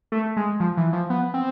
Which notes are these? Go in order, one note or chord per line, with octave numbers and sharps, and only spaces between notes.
A3
G#3
F3
E3
F3
B3
C4